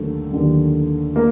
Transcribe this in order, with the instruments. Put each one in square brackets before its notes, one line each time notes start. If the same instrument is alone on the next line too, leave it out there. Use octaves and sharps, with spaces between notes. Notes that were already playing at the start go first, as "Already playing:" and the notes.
Already playing: [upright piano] D#2 D3 F#3 A3
D#2 D3 F#3
A#3